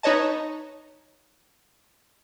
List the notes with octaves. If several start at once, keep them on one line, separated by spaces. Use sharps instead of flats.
D#4 B4 C#5 D#5 A5